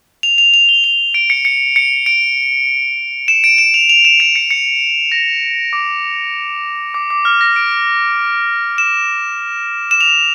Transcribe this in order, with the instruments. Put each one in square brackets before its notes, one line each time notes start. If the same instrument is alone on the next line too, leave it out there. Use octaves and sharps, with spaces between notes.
[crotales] F7
F7
F7
G7
F7
D7
C#7
C#7
C#7
D7
E7
D7
E7
F7
F7
E7
D7
C#7
C#7
A#6
D6
D6
D6
F6
A#6
D7
E7
E7
F7